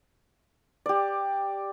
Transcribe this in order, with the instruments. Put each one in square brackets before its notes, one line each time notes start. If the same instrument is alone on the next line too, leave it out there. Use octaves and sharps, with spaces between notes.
[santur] G4 D5